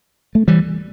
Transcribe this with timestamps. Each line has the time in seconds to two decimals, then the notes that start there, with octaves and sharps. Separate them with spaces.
0.35 A3
0.48 E3 G3